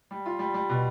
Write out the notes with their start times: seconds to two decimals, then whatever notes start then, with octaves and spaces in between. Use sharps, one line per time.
0.11 G3
0.26 F4
0.39 G3
0.54 G3
0.69 B2